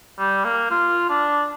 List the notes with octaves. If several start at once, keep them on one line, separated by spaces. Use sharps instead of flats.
G3
A#3
F4
D4